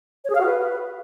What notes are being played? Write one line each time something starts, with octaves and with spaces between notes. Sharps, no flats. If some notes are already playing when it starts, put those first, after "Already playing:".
C#5
G#4
F5
F#4
B4